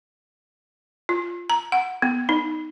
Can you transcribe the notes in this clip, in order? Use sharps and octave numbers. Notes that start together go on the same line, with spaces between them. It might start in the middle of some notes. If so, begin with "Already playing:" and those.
F4
A#5
F#5
B3
D#4